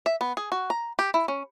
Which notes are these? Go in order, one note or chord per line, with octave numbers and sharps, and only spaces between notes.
E5
B3
G#4
F#4
A#5
G4
E4
C#4